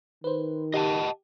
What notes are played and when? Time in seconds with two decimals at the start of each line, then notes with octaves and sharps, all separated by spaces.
0.24 D#3 B4 C5
0.74 G4 D#5 F#5 A5